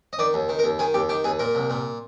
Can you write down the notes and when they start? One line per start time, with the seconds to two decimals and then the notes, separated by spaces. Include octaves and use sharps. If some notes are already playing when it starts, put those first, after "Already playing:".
0.13 D#5
0.19 D#3 D5
0.34 D#2
0.49 D#3
0.59 A#4
0.64 D#2
0.79 D#3 G#4
0.94 D#2 G4
1.09 D#3 G4
1.24 D#2 G#4
1.39 A#2 A#4
1.55 C2
1.70 A#2